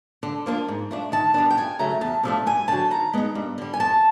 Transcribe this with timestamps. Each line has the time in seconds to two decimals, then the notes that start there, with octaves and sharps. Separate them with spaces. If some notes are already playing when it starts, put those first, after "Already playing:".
0.23 D3
0.46 F3 A#3 D4 F4
0.68 G#2
0.91 F3 A3 D4
1.12 D#3 A5
1.34 G3 B3 D4
1.50 G5
1.57 F2 G#5
1.79 C#3 F#3 A3 A#5
2.01 E2 A5
2.23 C3 F3 A3 D4
2.46 G2 G#5
2.68 D3 F#3 A5
2.91 D#3 A#5
3.13 G#3 B3 D#4
3.35 G2
3.58 D3 G3
3.74 G#5
3.80 F2 A5